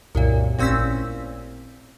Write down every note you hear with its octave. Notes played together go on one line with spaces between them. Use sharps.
C2 F#2 A#2
A1 A#2 C4 C#4 E6 B6